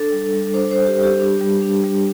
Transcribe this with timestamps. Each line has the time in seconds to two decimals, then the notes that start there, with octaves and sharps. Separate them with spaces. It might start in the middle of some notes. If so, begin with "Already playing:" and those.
Already playing: D4 A4
0.12 G3
0.33 G3
0.54 D4 C5
0.71 C5
0.76 D4
0.87 G4
0.98 G3
1.03 G4
1.20 D4
1.41 G3
1.62 D4
1.84 G3